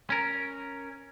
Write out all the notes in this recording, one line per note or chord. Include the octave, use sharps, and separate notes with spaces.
C#4 A#4